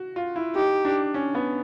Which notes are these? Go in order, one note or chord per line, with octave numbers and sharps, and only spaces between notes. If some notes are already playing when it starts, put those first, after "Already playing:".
Already playing: F#4
F4
E4
D#4 G4
D4
C#4
B3